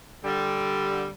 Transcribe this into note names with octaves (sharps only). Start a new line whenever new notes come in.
D3 G3